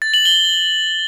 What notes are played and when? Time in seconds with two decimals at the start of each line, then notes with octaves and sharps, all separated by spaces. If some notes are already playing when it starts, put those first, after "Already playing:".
0.02 A6
0.14 F#7
0.25 G7